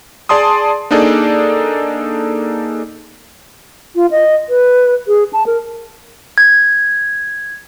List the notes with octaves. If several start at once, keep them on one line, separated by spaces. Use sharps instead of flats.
G#4 D5 A5 C6 D#6
A#3 D4 D#4 G#4 A4 D5
F4
D#5
B4
G#4
A5
A#4
G#6